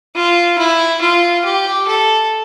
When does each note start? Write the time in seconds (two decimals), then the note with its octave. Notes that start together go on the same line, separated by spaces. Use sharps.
0.15 F4
0.58 E4
1.01 F4
1.45 G4
1.87 A4